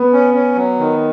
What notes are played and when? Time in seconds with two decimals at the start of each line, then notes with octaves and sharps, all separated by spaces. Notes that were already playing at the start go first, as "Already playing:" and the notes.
Already playing: B3
0.13 C#4
0.34 C#4
0.56 F#3
0.79 D#3